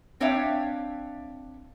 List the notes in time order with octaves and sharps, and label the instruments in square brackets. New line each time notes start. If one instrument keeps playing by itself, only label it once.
[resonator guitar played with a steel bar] C4 D4 C#5 E5 F5 G5